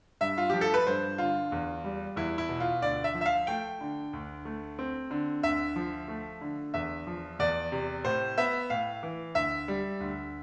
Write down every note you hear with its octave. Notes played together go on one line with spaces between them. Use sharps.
G2 E5
F4
F3 G4
A4
B4
G2 C5
D3 F4
E2
G3
E2 E4
E4
B2
F4
D2 D5
E5
F3
E5
F5
A3 G5
D3
D2
A3
C4
D3
D2 E5
F3
A3
D3
E2 E5
F3
E2 D5
C3
A2 C5
B3 E5
A2 F5
E3
D2 E5
G3
D2